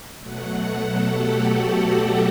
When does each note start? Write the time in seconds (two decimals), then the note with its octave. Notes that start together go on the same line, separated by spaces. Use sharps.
0.20 B2 F#3 A3 F#5
0.78 A4
1.07 G4
1.35 F#4
1.93 G4